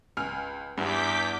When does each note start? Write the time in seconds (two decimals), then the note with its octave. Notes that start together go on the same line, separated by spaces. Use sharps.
0.17 C#2 G#5 F6
0.77 E2 G2 D6 G6 B6